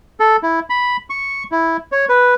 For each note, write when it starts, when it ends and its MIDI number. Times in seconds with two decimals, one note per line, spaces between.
0.20 0.37 69
0.43 0.60 64
0.70 0.97 83
1.10 1.43 85
1.52 1.77 64
1.92 2.05 73
2.09 2.35 71